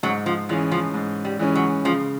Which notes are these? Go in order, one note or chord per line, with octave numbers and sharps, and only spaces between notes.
G#2 F#3
F3
E3 F3 G#3 C#4
F3
G#2
G3
E3 G#3 C#4
F#3
C#3 F3